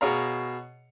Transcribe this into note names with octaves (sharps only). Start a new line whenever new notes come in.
B2 G#4 C#5 F5 A#5